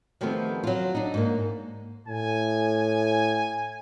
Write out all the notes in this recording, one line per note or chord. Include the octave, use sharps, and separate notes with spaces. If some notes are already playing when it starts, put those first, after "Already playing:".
D#3 F3 G3 A3 B3 C4
F#3 F4
D4 D#4
G#2 A#3
A2 G#5